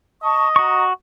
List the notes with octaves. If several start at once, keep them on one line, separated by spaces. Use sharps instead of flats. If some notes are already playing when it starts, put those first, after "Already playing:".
D#5 A5 C#6
F#4 A#5 C#6